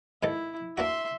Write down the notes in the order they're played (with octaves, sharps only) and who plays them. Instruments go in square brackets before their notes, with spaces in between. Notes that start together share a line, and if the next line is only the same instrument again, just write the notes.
[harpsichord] G#2 D#3 A4 [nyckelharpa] E4
[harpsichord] A#3 D4 F#4 [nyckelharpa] E5 C6